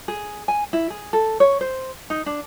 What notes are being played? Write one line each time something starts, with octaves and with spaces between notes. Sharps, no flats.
G#4
G#5
E4
G#4
A4
C#5
C5
D#4
D4